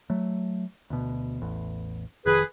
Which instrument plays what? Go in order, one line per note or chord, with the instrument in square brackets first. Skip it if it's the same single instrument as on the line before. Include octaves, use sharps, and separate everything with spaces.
[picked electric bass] F#3 A3
D2 B2
A1 E2
[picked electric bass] F1 D#3 [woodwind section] G#4 B4